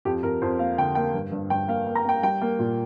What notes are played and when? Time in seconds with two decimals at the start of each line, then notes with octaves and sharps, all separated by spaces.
0.05 F2 G4
0.23 F2 A#4
0.42 F2 C5
0.59 A#3 F5
0.78 D3 G5
0.95 A#3 G5
1.14 G2
1.32 G2
1.50 G2 G5
1.68 A#3 F5
1.87 A#3
1.95 A#5
2.05 A#3 G5
2.23 G3 G5
2.41 A#3
2.59 A#2